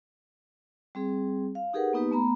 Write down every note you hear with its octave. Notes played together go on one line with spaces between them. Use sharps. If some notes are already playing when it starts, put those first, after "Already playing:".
G3 C4 G#4
F5
D#4 G4 G#4 A#4 B4 F#5
A#3 B3 D#4 G4 B4
A3 B3 A#5 B5